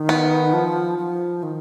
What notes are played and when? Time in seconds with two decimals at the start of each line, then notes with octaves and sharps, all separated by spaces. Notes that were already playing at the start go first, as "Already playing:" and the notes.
Already playing: D#3
0.09 B3
0.53 F3
0.98 F3
1.43 D#3